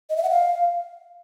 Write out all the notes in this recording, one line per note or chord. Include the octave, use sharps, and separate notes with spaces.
D#5
E5
F#5
F5